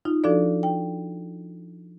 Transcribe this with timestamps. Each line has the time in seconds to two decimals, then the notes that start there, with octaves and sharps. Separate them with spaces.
0.05 D#4 F4
0.24 F3 D4 F#4 A4 D5
0.63 G5